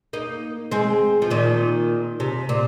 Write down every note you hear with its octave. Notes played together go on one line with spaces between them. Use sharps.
A#3 D#4
G#3 C4
F3
A#2 D#3
C3
A#2